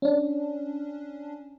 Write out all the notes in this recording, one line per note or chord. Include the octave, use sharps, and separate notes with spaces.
C#4 D4